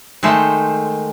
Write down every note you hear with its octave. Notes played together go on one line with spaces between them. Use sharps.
D#3 G#3 A3 C5